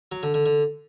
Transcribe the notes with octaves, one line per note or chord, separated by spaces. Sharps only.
F#3
D3
D3
D3